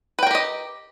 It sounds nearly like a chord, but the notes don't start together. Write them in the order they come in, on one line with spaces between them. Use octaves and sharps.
B4 G5 A#4 G4 D#5